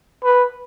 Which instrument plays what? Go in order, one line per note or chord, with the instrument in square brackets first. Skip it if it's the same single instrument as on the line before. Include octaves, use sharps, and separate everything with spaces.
[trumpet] B4